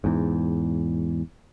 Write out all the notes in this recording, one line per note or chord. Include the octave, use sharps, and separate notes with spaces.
E2 G#2